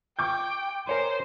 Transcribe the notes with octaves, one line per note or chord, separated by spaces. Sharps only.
G5 C#6 D6 G6
A#4 C5 C#5 G#5